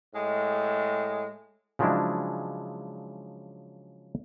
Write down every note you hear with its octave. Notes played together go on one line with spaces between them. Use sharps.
A2 G#3
C#3 F3 F#3 G#3 D4 E4